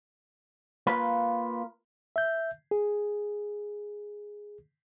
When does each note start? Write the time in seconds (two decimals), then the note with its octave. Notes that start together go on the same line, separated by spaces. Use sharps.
0.87 A#3 F4 B4
2.16 E5 G6
2.71 G#4